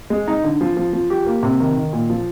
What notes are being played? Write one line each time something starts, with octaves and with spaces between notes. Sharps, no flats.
G#3
D#4
D3
F3
F3
F3
G4
A#3
C3
D#3
D#3
A#2
F3